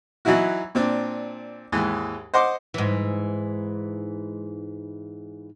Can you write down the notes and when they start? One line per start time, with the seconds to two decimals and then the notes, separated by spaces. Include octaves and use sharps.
0.25 E3 F#3 D#4 E4 F#4
0.75 A#2 C4 D4
1.72 D#2 G#2 E3
2.34 C5 D#5 F#5 C6 D6
2.74 G#2 E3